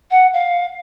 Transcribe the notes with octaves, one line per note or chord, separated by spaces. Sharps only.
F#5
F5